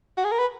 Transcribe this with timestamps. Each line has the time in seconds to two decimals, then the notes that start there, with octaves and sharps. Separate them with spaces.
0.17 F#4
0.24 G#4
0.32 A#4
0.39 B4